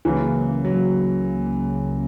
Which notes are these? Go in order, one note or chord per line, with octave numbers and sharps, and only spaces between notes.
C#2 C#3 E3 F#3 A#3
F#3